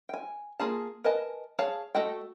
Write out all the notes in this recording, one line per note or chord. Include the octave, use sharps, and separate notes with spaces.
G5 G#5
A#3 F4 G#4 A5
A#4 B4 D#5 G#5 A5
G#4 C#5 F5 A5
A3 F#4 A4 D#5 G5